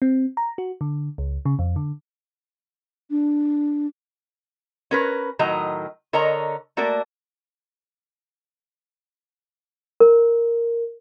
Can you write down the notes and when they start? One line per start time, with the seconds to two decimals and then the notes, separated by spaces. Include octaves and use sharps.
0.02 C4
0.37 A#5
0.58 F#4
0.81 D3
1.18 C#2
1.46 C#3
1.59 F2
1.76 D3
3.10 D4
4.91 C#4 A#4 B4
5.39 A2 D#3 F#3 D#5 A#5
6.13 D3 A#4 C#5 D#5 A#5
6.77 A3 A#3 F#4 A#4 D5
10.00 A#4